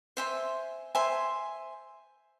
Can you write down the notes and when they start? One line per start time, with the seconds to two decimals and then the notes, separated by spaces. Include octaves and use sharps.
0.17 C5 E5 G#5 C6
0.95 C5 E5 G#5 C6